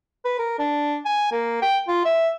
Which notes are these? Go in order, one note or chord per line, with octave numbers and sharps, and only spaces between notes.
B4
A#4
D4
G#5
A#3
G5
F4
E5